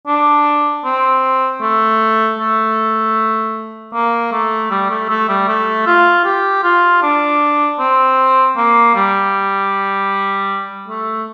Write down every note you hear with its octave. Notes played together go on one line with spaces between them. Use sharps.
D4
C4
A3
A3
A#3
A3
G3
A3
A3
G3
A3
F4
G4
F4
D4
C4
A#3
G3
A3